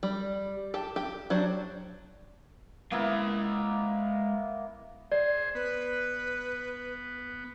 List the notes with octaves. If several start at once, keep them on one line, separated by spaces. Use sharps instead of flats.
G3
G4 A5
G4
F#3 D4 C5
G#3 A#3 B3 E4 F5
G#4 C5 D5
B3 B4